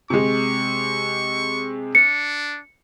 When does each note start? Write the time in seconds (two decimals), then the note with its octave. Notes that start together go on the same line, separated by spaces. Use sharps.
0.10 C3 G#3 C#6
1.95 D4 C#7